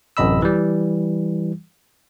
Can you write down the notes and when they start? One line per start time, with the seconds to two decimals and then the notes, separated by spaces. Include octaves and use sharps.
0.17 A1 F#2 C3 D#5 B5 E6
0.42 E3 G3